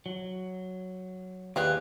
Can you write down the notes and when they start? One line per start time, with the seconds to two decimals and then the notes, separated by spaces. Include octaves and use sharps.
0.06 F#3
1.56 D#2 G4 G#4 B4 D5 F5